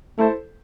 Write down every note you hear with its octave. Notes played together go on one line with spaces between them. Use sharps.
A3 E4 A4 C5